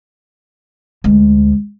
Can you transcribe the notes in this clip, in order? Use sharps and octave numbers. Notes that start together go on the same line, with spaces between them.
D2 G#3